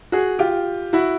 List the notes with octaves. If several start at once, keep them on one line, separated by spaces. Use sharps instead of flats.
F#4 G#4
F4 G4
E4 F#4